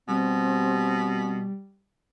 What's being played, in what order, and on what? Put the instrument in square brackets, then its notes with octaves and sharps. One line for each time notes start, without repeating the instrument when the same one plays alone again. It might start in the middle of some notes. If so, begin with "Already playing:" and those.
[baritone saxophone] B2 [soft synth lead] G3 [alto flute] C4